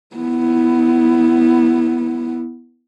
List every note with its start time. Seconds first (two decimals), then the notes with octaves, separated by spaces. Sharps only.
0.16 B3 E4